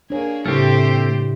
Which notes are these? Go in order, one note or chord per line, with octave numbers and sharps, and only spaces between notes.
A#3 D4 G#4 C#5
A2 C#3 G3 A3 C4 E4 G4 C5